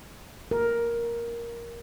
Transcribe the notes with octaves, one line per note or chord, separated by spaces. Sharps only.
A#4